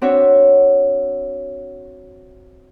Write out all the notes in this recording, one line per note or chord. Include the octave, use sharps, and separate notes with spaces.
C4 D4 F#4 C#5 E5